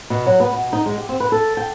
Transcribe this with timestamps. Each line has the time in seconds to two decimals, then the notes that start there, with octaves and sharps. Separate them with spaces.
0.10 B2
0.26 F#3
0.40 B3
0.53 B2
0.73 D#4
0.86 G#3
0.98 G4
1.09 C4
1.20 B4
1.32 A4
1.57 G5